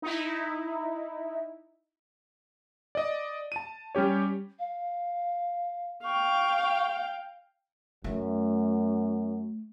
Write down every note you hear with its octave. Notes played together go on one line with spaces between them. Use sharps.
D#4 E4
D5 D#5
A5 D#7
G3 C#4 G4 C#5
F5
F5 G5 C#6
F#2 A3